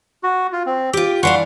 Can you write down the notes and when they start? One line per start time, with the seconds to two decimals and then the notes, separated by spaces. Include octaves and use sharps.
0.23 F#4
0.52 F4
0.66 C4
0.93 F4 G4 D6
1.23 E3 D4 F5 F#5 C6 C#6